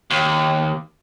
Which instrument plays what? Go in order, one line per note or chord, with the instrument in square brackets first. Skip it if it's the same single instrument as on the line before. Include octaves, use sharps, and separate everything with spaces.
[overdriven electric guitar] D#2